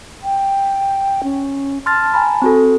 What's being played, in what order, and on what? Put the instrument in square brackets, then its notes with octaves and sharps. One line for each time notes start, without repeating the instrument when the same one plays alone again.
[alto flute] G5
C#4
[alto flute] A5 [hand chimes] C6 F6 A6
[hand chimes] G#5 A#5 B5
C4 F#4 A4